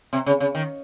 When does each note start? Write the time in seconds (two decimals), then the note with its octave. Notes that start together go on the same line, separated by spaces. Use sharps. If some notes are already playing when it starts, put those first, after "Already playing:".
0.13 C3
0.26 C#3
0.40 C#3
0.55 D#3